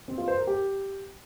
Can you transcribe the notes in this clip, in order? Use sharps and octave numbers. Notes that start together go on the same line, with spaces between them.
C4
F4
C5
A#4
G4